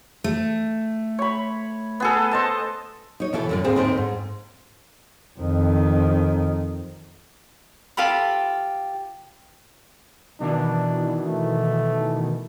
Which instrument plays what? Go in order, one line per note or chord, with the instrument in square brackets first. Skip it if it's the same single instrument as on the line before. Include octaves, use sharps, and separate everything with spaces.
[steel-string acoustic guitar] A3
[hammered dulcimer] C#5 B5
B3 G#4 A4
C5 D#5 A5
[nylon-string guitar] D#4 C#5
B2 E3 E4 A4
F#2 A2 D3
D2 G#2 C4 G#4 F5
D2 A2 C4 D#4
G#2
[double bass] F2 D#3
[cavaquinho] F4 G4 A4 B5
[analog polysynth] B2 D#3 E3 [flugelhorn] D4
[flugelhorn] A3